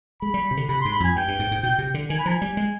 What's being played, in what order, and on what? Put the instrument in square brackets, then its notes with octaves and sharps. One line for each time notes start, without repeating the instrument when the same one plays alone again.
[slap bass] G#3 [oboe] B5
[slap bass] G3
C3
D3
[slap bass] C3 [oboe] B5
[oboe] C6
[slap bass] G#2
[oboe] B5
[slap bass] F2 [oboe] G#5
[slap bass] G2 [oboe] G5
[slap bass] G2
G#2
G#2
B2
C3
D3
[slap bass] D#3 [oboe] G#5
[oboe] B5
[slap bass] F3 [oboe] G#5
[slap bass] G3
G#3